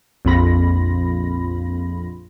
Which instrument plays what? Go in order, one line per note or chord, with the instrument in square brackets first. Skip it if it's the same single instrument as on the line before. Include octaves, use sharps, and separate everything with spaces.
[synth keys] A#1 F2 F4 B5 A#6